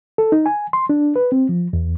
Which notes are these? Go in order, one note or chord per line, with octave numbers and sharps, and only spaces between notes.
A4
D#4
G#5
C6
D4
B4
C4
F3
E2